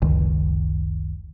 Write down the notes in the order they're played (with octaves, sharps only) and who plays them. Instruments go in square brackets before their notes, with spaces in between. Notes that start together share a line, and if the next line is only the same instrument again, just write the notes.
[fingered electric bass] F#1 C#2 D#3